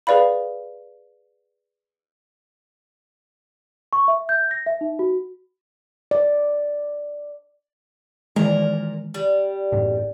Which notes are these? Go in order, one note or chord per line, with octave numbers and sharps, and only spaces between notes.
G#4 B4 D5 F5 B5
C#6
E5
G6
A#6
E5
D#4
F#4
D5
A#2 D#3 E3 G#3 A#4
G3
A1 F#2 A2